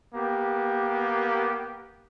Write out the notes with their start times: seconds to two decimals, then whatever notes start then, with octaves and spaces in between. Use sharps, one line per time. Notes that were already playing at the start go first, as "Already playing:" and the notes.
0.15 A#3 B3 G4